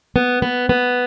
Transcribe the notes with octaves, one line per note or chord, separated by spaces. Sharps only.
B3
B3
B3